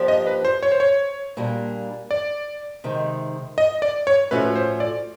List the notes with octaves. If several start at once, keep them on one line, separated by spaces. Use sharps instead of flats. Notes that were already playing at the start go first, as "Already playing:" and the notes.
Already playing: F3 A#3 D4 G4
D#5
B4
C5
C#5
C5
C#5
A#2 G3 A#3 D4
D5
C3 D#3 G#3
D#5
D5
C#5
A2 F3 A3 C#4 F#4 B4
C5
D5